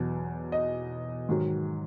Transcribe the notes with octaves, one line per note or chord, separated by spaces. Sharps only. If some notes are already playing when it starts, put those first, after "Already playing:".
Already playing: E2 B2 F#3
D#5
G#2 D#3 F#3